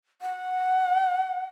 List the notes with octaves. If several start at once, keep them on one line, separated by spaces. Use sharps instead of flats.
F#5